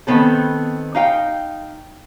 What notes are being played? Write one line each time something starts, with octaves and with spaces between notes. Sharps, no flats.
D#3 B3 C4 A4
D#4 F5 G5